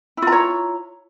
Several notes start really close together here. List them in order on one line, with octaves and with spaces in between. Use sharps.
E4 F4 A#5 C#5